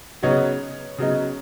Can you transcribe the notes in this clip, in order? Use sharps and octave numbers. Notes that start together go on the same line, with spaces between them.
C#3 F#3 B3 D#4 C#5
C#3 F#3 B3 D#4